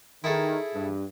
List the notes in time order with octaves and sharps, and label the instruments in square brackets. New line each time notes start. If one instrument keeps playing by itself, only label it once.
[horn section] D#3 [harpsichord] E4 G#4 A4
[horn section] G2